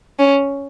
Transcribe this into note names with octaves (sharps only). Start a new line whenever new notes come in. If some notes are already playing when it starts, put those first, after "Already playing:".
C#4